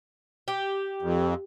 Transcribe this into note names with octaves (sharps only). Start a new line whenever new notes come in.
G4
F2